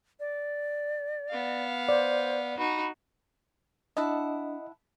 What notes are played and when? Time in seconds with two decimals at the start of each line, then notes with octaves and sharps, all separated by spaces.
0.20 D5
1.29 B3 F5
1.89 C5 D5
2.58 D#4 F#4 B5
3.97 D4 E4 D#5 F#5 A5